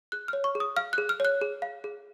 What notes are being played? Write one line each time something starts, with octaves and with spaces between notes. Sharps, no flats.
G#4 F#6
C#5 F6
C#6
G#4
D#6
F5 F6
F#6
G#4
F6
C#5 F#6
G#4
F5
G#4